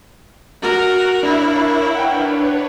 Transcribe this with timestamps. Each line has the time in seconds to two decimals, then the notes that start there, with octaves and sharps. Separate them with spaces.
0.62 F#4 A#4
1.23 D4 E4 A#4 C#5 F5
1.95 D4 B4 C#5 F#5 G5